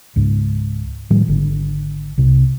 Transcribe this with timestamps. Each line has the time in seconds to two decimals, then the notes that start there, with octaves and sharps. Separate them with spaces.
0.16 C#2 G#2
1.10 A2 D#3 F3 G3
1.28 G#1 D3
2.18 C2 C3